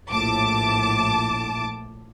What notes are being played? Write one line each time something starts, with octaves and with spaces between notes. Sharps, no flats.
A#1 A2 A5 D6